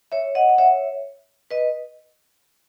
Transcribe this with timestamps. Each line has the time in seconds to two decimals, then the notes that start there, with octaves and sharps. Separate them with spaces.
0.12 C#5 E5
0.35 D#5 F#5
0.49 F#5
0.58 C#5 E5
1.51 B4 D#5